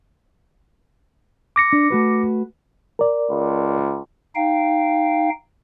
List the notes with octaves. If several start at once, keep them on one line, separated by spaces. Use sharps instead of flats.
D6 A#6 C#7
D4
A3 F#4 B4
A#4 D5
C#2
D#4 F5 G5